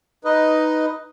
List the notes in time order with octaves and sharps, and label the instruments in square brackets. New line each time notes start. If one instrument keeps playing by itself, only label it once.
[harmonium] D#4 B4 D#5